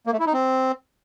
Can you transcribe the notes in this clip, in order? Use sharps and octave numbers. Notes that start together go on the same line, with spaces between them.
A#3
A3
E4
D#4
C4